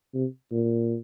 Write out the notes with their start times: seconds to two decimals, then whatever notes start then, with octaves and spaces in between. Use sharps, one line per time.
0.15 C3
0.52 A#2